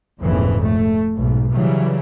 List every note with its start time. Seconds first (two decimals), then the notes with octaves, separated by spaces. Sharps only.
0.21 F1 A#1 F2 G#2 C#3 E3
0.63 A3
1.16 B1 G#2
1.53 C#3 E3 F#3 G3